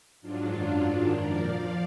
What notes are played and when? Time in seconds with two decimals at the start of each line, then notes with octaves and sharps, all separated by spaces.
0.21 G#2 F#3 D4 F4
0.50 F#2 D#3 F#3 D4 F4
0.80 G#2 D#3 F#3
1.09 F#2 F3 A#4 D5
1.37 A#2 F3 D5 F5